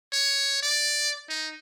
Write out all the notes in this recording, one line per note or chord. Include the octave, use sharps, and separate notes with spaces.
C#5
D5
D#4